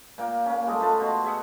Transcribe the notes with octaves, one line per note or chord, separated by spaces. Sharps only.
A#2 A#3 G5
A#3 C#4
G3 G#3 A4 D#5
A3 F4 B4 A5
B2 F#4 C6
G#4 E5 F#5